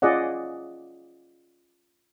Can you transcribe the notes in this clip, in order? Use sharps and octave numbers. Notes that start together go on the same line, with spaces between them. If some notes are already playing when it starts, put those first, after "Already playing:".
C#4 F4 G#4 D5 D#5 F#5